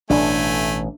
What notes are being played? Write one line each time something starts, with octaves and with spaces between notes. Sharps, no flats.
A1 B2 A3 D4 G#5